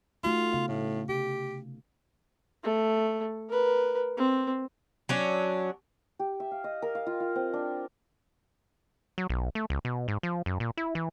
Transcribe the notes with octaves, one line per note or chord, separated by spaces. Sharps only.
A3 D#4 F4 F#4
C#3 B3 F5
A2
C3 G4
A3
A#4 B4
C4
F#3 C#4 D4
G4
E5
F5
D#5
A#4
F5
F4
F4
C4
D4
F#3
B1
A3
C#2
B2
G#2
F3
F#2
A#2
E4
E3